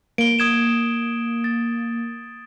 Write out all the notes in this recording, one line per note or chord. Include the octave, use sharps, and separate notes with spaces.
A#3 D7 G7
D#6 G#6 E7
A6